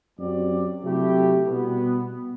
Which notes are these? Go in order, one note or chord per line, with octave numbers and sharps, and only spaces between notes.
F#2 F#3 C4 G4 D5
C3 F#3 A3 E4 G4
B2 G3 B3